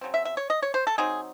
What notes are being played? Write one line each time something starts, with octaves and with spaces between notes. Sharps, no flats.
C#3 F#3 C4
E5
E5
C#5
D#5
C#5
C5
A4
F#3 C4 D#4 G#4